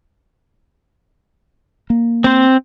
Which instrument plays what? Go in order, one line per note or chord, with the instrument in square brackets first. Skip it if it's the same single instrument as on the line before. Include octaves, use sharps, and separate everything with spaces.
[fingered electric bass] A#3
[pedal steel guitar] C4 C5